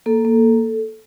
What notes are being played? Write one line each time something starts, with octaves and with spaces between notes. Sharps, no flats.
A#3 A4
A#3